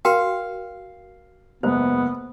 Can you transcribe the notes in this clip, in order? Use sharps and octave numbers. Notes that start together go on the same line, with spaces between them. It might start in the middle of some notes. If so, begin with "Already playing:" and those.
F#4 A#4 F5 G5
F#1 G#2 B3 C5